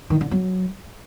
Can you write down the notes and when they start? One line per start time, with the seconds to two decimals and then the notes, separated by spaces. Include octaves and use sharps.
0.10 D#3
0.21 D3
0.31 F#3